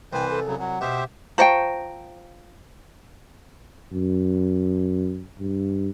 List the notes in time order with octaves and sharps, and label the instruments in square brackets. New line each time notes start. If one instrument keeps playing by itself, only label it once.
[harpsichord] C2 G#5 [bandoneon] E3 B4 C5 [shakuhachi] G5
[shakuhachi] A4
[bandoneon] C#3 F#3
[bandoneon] F#3 [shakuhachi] F#5
[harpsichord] B2 [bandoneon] G4 C5 E5
[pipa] F3 A#5 C#6 [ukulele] C5 G5
[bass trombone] F#2
G2